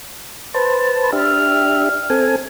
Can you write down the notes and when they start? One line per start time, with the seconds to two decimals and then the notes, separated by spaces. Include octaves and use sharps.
0.54 B4 C5 A5
1.12 D4 G4 E5 F6
2.10 C4 A4 G#5